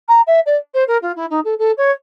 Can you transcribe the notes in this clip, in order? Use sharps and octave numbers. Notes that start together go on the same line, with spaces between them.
A#5
E5
D5
C5
A#4
F4
E4
D#4
A4
A4
C#5